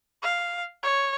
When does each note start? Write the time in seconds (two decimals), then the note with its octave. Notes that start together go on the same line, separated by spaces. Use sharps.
0.23 F5
0.83 C#5